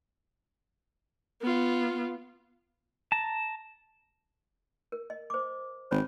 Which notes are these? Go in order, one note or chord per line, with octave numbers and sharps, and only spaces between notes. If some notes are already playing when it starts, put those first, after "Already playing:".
B3 F4
A5 A#5
A#4
D#5
C5 D6
G#1 C5 C#5 B5